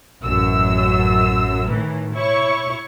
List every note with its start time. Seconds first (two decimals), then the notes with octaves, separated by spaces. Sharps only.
0.24 A1 F#2 E6
1.70 A2 D#3 E3
2.14 E4 C#5 C#6